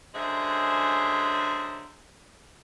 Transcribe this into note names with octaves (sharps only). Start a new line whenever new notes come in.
F#2 D3 G#3 G#4 C5 E5